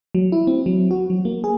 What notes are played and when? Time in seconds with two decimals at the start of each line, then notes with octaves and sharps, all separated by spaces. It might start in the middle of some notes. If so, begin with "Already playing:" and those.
0.15 F#3
0.32 E4
0.47 C4
0.66 F#3
0.91 F#4
1.10 F#3
1.25 A#3
1.44 G#4